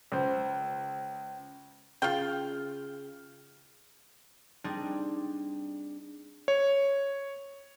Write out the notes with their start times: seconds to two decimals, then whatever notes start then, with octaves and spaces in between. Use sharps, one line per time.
0.12 C#2 C5
2.02 C#3 F4 G5 F6
4.64 G3 C4 D4 D#4 G#4
6.48 C#5